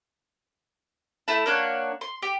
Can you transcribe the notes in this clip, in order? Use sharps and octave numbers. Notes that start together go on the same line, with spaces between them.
A3 E4 A5
A#3 D4 C#5 F#5
C6
G4